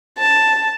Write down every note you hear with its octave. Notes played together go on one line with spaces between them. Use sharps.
A5